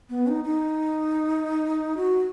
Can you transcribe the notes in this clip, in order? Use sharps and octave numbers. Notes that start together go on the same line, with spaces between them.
B3
D#4
D#4
F#4